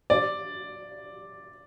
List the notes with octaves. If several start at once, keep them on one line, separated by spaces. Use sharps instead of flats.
D5